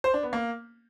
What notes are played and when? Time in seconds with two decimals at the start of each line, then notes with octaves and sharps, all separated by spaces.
0.04 C5
0.14 D4
0.23 B3
0.33 A#3